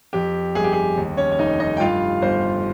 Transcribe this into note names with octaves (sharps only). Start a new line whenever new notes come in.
F2 G4
G1 G#4
G4
G#4
D#2
C#4 C#5
C#5
F1 D#4 D#5
D#4 D#5
G5
G2 F4 F5
G1 C5 C6